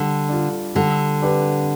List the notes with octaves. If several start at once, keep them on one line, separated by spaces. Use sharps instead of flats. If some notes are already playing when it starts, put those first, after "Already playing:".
Already playing: D3 G3
D4 F4
D3 G3
D4 G4 B4